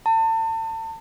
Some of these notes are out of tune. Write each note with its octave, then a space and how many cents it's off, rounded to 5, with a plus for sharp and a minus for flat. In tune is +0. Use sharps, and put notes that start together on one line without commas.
A5 +35